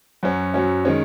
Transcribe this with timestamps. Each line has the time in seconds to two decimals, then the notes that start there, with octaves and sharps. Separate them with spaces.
0.23 F#2 F#3 C#4
0.54 F#2 F#3 C#4
0.85 D#3 G#3 C#4